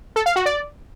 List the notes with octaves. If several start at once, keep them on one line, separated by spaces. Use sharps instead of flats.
A4
F5
F#4
D5